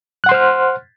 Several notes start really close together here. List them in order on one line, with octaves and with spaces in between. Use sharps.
F#6 F#5 C6 C5 F6